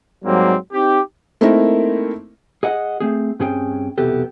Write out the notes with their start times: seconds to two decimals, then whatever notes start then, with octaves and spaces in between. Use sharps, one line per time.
0.25 G#2 F#3 G3 A#3 C4
0.73 C4 D#4 G4
1.41 A3 A#3 C4 D#4 E4 A#4
2.63 G#4 D#5 F#5
3.00 A3 C4 G#4
3.40 G2 C4 C#4 G#4 G5
3.98 B1 E2 C3 B3 G4 A4